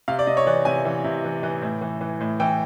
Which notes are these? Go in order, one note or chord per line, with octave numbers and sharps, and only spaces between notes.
C3 F5
D5
C3 D#5
C#5
E3 D5
C3 G#5
E3
C3
E3
E3
A2
E3
E3
A2
E3 G5